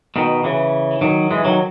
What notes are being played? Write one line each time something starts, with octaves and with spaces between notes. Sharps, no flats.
B2 D#3
C#3 E3
D#3 F#3
E3 G#3
D#3 F#3